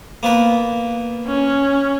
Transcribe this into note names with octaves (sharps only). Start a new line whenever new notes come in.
A#3 B3 B4
C#4